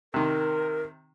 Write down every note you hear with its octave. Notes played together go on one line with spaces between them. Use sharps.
C3 D#3 A#4